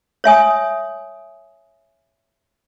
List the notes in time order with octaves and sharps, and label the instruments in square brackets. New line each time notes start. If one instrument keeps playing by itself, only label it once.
[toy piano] C#5 E5 G#5 D#6